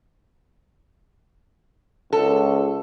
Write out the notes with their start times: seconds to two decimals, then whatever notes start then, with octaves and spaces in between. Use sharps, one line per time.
2.13 C#2 A4